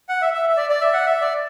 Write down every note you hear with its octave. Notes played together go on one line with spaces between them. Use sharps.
F#5
E5
E5
E5
D5
D5
E5
F#5
E5
D5